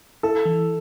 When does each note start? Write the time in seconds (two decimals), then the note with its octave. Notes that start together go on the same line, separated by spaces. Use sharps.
0.23 E4 A4
0.45 E3